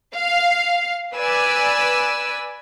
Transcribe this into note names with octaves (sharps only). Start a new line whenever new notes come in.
F5
B4 D5 G#5 E6